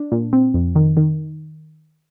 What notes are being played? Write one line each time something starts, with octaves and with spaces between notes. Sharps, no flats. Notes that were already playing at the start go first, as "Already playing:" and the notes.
Already playing: D4
A#2
C4
F2
D#3
D#3